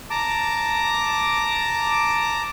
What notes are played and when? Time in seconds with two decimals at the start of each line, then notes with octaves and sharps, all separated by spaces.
0.10 A5 A#5 D6